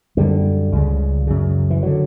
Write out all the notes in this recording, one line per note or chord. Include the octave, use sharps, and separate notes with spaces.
F#2 D3 G3
C#2 C#3
F#2 C#3
E3
D3 F#3